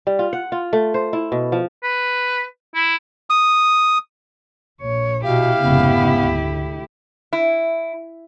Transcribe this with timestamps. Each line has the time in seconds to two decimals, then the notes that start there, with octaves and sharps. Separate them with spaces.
0.07 G3
0.19 F4
0.33 F#5
0.52 F4
0.73 A3
0.94 C5
1.13 E4
1.32 B2
1.52 F3
1.83 B4
2.75 E4
3.30 D#6
4.82 A#1 C#5
5.24 B2 E4 G4 F5
5.61 F1 G#2 C#3 B3
6.19 D2
7.33 E4